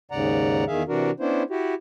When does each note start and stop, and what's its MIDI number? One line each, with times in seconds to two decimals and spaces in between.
0.11 0.64 39
0.11 0.64 44
0.11 0.64 49
0.11 0.64 74
0.11 0.64 78
0.11 0.64 82
0.67 0.83 40
0.67 0.83 51
0.67 0.83 68
0.67 0.83 76
0.67 0.83 77
0.88 1.11 48
0.88 1.11 52
0.88 1.11 62
0.88 1.11 66
0.88 1.11 70
1.20 1.43 59
1.20 1.43 61
1.20 1.43 62
1.20 1.43 64
1.20 1.43 72
1.50 1.74 64
1.50 1.74 66
1.50 1.74 67